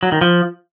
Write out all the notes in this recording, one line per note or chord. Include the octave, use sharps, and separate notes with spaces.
F#3
D#3
F3